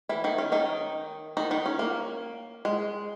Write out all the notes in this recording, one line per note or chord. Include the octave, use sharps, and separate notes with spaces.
E3 E4
D#3 D#4
C#4
D#3 D#4
D#3 D#4
D#3 D#4
C#4
A#3
G#3